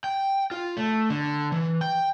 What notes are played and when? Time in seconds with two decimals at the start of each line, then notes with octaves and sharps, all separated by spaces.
0.04 G5
0.51 F4
0.77 A3
1.10 D3
1.52 E3
1.81 G5